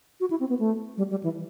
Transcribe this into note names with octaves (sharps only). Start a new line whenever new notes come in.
F#4
E4
C4
B3
A3
G3
G3
E3